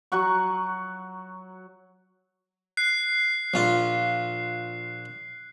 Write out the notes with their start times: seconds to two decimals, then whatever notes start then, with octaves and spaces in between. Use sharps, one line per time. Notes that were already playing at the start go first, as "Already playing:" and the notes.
0.12 F#3 F#4 F#5 C#6
2.77 F#6 C7
3.54 A#1 F4